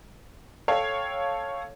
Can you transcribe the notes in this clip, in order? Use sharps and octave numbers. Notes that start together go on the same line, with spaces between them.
A4 C#5 F5 G5